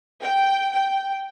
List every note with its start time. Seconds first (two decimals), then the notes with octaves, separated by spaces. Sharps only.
0.23 G5
0.74 G5